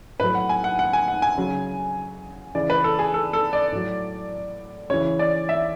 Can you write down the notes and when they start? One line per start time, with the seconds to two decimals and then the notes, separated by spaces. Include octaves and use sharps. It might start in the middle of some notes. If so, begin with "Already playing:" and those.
0.20 A2 F#3 B4
0.35 F#5
0.49 G#5
0.64 F#5
0.79 F#5
0.93 G#5
1.08 F#5
1.22 G#5
1.37 C#3 F#3
2.55 C#3 E3 D5
2.70 B4
2.84 A4
2.99 G#4
3.14 A4
3.33 A4
3.53 D5
3.72 A2 F#3
4.90 C#3 E3 C#5
5.19 D5
5.49 E5